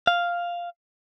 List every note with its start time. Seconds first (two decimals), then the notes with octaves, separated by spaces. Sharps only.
0.07 F5